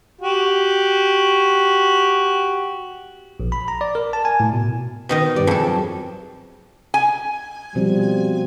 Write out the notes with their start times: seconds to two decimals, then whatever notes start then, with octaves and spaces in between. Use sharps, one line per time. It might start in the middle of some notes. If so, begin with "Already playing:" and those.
0.21 F#4 G4
3.40 A#1
3.52 B5
3.68 A#5
3.81 D5
3.95 A#4
4.13 A5
4.25 G#5
4.40 A2
4.53 B2
5.09 B2 D#3 D#5
5.36 G2 G3 D5
5.47 F2 G#4 A4
5.66 F#3
6.94 G#5
7.75 B2 F3 G3 C4